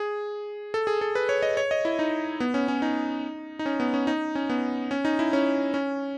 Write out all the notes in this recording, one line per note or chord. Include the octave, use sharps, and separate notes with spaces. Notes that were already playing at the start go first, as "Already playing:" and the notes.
Already playing: G#4
A4
G#4
A4
B4
C#5
D#5
C#5
D#5
E4
D#4
B3
C#4
C#4
D#4
D#4
C#4
B3
C#4
D#4
C#4
B3
C#4
D#4
E4
C#4
C#4